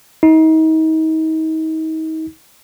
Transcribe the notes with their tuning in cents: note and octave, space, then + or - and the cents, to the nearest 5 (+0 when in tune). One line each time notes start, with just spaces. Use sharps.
D#4 +35